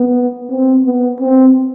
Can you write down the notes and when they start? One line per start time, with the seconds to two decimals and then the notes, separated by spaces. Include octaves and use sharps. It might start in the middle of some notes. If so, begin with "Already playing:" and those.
Already playing: B3
0.50 C4
0.86 B3
1.20 C4